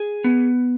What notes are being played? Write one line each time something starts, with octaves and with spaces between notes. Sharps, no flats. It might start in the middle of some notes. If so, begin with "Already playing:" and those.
Already playing: G#4
B3